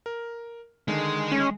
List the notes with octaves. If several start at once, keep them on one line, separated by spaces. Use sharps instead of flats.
A#4
D3 D#3 G#3
C#4